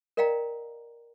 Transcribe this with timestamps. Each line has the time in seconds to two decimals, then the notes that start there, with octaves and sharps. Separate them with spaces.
0.17 A#4 D5 D#5 F5 G5 A#5